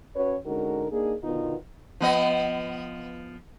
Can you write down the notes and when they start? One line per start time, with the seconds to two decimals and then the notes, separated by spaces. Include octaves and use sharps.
0.15 C#4 F#4 B4 C#5
0.46 D3 G#3 C#4 D#4 F#4 A#4
0.91 A#3 D4 D#4 G#4
1.23 B2 D3 D#3 B3 D#4 F4
2.00 F3 B3 D#5